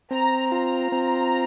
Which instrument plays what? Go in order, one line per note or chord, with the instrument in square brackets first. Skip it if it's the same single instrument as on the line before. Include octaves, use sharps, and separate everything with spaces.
[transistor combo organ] C4 [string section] A#5
[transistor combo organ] F4 [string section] A#5
[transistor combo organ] C4